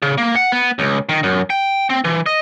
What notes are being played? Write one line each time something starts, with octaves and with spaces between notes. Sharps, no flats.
C#3
A#3
F#5
B3
C#2
D#3
F#2
G5
C4
E3
D#5